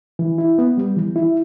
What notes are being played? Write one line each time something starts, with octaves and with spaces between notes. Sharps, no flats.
E3
E4
B3
G3
E3
E4